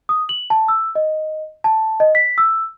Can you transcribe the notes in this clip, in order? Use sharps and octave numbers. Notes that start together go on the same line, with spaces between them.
D#6
F#7
A5
E6
D#5
A5
D#5
B6
E6